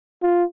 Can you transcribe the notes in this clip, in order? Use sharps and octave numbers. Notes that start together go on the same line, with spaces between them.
F4